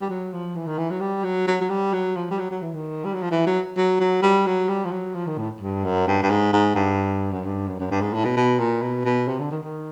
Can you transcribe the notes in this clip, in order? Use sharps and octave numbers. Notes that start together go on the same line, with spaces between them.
G3
F#3
F3
E3
D#3
E3
F#3
G3
F#3
F#3
F#3
G3
F#3
F3
G3
F#3
F#3
E3
D#3
G3
F#3
F3
E3
F#3
F#3
F#3
G3
F#3
G3
F3
F#3
F3
D#3
A2
G2
F#2
G2
G2
G#2
G#2
G2
F#2
G2
F#2
F#2
G2
G#2
A2
B2
B2
A#2
B2
B2
C3
D3
D#3
D#3